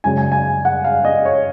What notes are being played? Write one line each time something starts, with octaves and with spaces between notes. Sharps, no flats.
F#2 C#3 G#3 C#4 G#5
G#5
G#5
F#5
F5
D#5
C#5